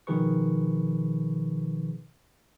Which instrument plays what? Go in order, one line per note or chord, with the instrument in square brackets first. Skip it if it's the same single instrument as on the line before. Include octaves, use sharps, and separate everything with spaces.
[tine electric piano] B2 D#3 F3 G#4 B4 C#6